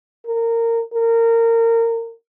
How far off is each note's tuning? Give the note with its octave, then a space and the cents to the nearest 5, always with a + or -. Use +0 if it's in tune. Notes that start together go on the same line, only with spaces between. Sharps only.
A#4 -20
A#4 -25